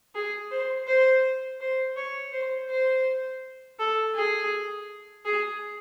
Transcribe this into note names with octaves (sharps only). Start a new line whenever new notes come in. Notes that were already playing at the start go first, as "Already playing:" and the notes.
G#4
C5
C5
C5
C#5
C5
C5
A4
G#4
G#4